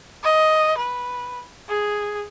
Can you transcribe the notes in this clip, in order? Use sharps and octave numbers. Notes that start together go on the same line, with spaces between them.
D#5
B4
G#4